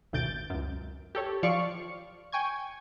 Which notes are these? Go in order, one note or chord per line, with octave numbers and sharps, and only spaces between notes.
G#1 D2 B2 G6 A6 D7
C#2 F#2
G4 A4 C#5
F3 F4 D5 F5 C#6 C#7
G5 G#5 C#6 G#6